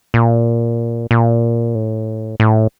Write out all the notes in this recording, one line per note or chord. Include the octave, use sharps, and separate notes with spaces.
A#2
A#2
A2
A2